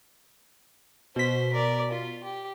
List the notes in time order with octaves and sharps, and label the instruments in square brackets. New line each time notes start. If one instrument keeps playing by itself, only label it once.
[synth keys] B2 B6 [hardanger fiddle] C5
[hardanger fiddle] A#4 D5
F4
G4